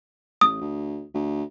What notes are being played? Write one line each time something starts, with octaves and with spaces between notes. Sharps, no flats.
A1 D#6
D2
D2